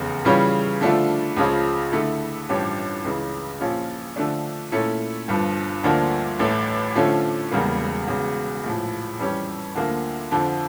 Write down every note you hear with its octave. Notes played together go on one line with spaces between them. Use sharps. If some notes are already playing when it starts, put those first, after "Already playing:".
Already playing: F1 E2 C#3
C#3 E3 G3 C#4 F4
D3 F3 A3 D4 F4
C#2 C#3 F3 C#4 F4
D3 A3 E4 A4
A1 G2 F3 C#4 G4
C#2 C#3 E3
A#1 A#2 F3 C#4 F4
D3 F3 A3 D4
A#2 A3 C#4 E4 A4
G1 G2 F3
D2 D3 F3 A#3 D4
A1 A2 E3 A3
D3 F3 A3 C#4 F4
E1 E2 C#3 G3 A#3
E1 E2 C#3
A#1 A2 F3
F2 E3 G3 C#4 G4
D2 D3 F3 A#3
F2 D3 F3